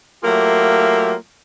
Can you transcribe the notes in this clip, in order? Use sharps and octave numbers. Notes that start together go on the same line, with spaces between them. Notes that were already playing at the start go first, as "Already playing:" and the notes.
F#3 A3 A#3 F4 G4 E5